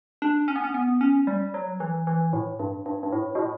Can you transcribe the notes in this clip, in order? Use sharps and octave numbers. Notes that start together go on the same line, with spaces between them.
D4
C#4
B3
C#4
B3
C#4
G3
F#3
E3
E3
A2
G2
G2
G2
A2
B2
A2